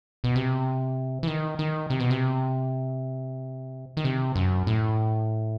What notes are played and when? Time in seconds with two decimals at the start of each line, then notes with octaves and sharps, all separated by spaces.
0.24 B2
0.36 C3
1.23 E3
1.27 D#3
1.59 D#3
1.90 C3
2.00 B2
2.10 C3
3.97 D#3
4.04 C3
4.36 F#2
4.67 A2